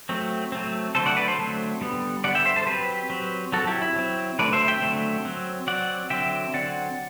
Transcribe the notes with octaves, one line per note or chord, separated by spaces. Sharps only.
F#3 A3 C4
F#3 A3 C4
D3 F#3 A3 C4 A4 C5
D5 F#5
B4 D5
A4 C5
D3 F#3 A3 C4
D3 G3 B3
D3 G3 B3 D5 F#5
E5 G5
C5 E5
A4 C5
F#3 C4 G4 B4
F#3 C4
F#3 C4 F#4 A4
E4 G4
E4
F#3 C4
D3 F#3 A3 C4 B4 D5
C5 E5
E5 G5
D3 F#3 A3 C4
F#3 C4
F#3 C4 D5 F#5
D3 F#3 C4 E5 G5
D3 F#3 C4 D5 F#5